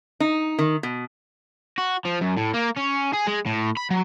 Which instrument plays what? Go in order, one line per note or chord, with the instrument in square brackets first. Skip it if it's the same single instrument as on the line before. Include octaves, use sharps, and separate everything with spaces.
[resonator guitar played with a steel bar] D#4
D#3
B2
[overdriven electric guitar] F#4
F3
F#2
A2
A#3
C#4
G#4
G#3
A2
B5
F#3